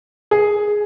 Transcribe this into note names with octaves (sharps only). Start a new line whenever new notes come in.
G#4